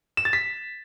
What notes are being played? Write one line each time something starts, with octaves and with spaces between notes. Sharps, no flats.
E7
A6
B6